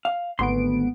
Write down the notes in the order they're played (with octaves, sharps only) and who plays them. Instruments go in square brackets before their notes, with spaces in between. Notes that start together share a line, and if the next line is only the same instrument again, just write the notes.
[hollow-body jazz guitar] F5
[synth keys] G#1 B3 D7 [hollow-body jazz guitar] D2 C6